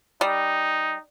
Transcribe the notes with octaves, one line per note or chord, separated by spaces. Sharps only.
G3 D#4